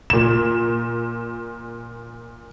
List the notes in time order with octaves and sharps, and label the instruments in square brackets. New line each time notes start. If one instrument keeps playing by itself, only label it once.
[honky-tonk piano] A#2 E7